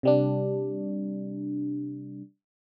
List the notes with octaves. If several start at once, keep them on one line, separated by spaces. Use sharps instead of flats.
C3 G3 D4